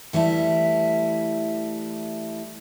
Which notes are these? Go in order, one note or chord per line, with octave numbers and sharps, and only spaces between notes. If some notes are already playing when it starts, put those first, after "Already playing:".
E3 G3 A3 E4